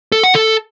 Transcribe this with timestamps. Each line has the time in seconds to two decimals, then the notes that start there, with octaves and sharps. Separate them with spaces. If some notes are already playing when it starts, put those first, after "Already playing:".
0.12 A4
0.24 F#5
0.35 A4